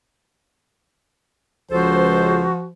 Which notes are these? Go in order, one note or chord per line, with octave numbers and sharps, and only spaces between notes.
C#2 F3 F#4 A4 C5